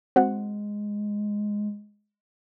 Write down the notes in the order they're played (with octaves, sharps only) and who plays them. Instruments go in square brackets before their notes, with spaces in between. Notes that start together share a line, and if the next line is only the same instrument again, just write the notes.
[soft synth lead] G#3 [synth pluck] C4 F#4 F#5